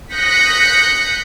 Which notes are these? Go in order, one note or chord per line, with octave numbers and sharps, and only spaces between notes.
D#6 F#6 G6 A#6 B6 C#7